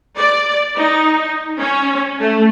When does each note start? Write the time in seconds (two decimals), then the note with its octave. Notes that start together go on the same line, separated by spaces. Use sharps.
0.17 D5
0.77 D#4
1.59 C#4
2.19 A3